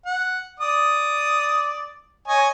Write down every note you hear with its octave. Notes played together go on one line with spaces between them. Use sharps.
F#5
D5 D#6
C#5 D#5 G#5